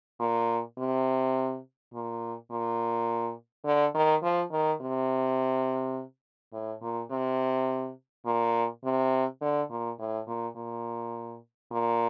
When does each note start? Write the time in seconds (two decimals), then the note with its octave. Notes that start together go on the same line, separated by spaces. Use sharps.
0.20 A#2
0.78 C3
1.94 A#2
2.51 A#2
3.65 D3
3.95 D#3
4.23 F3
4.52 D#3
4.81 C3
6.53 A2
6.82 A#2
7.11 C3
8.26 A#2
8.85 C3
9.42 D3
9.70 A#2
9.99 A2
10.27 A#2
10.56 A#2
11.71 A#2